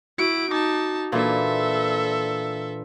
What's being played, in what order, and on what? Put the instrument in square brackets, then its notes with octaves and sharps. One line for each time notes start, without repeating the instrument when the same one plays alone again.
[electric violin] E4 D7 [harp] F#4
[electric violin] D#4 A5 [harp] D6
[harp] A#2 E3 D4 [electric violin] A4 E5